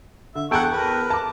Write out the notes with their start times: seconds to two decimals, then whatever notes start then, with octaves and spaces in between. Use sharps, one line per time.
0.35 D3 E5
0.51 E2 G#4 A4 F#5 G5 A5 C#6 F#6
0.71 A#4 B4
1.10 A5 D6